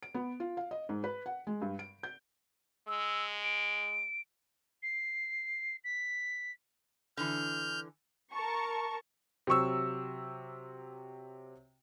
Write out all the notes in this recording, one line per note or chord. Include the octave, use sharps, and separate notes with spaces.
D7
B3
F4
F5
D#5
G#2
B4
F#5
G#3
G2
D7
G6
G#3 E6
D7
C7
B6
D3 E3 F6 G6
A#4 A5 A#5 C#6
C3 F#3 C#6 E6